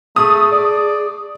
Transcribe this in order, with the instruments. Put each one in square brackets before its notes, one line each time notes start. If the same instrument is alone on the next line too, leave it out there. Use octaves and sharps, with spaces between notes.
[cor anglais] A3 [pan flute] G#4 [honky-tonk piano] D#6
[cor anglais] D5